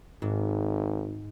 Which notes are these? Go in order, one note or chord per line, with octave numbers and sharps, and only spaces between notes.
G#1 G#2